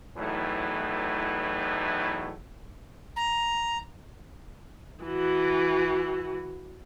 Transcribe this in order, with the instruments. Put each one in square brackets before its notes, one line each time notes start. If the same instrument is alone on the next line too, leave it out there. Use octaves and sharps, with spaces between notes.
[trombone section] E2 A2 E3 F#3 A3 D#4
[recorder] A#5
[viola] E3 F#4